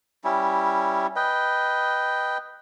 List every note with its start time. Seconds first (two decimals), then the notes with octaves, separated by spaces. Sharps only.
0.24 G3 C#4 E4
1.16 B4 D#5 G5